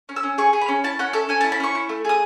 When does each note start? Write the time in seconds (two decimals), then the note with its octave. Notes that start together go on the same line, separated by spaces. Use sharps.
0.09 C#4
0.16 E6
0.23 C#4
0.38 G#4 C#6
0.53 G#4
0.61 B5
0.68 C#4
0.84 E4 A5
0.99 C#4 F#5
1.13 A4 E5
1.29 C#4 G#5
1.41 A5
1.44 E4
1.52 B5
1.60 C#4 C#6
1.75 E4
1.89 A3
2.05 G#4 D#6